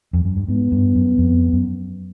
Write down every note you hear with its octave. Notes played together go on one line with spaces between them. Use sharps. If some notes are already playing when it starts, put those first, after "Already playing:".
F2
F#2
G2
G#2 B3
G2
F#2
F2
F#2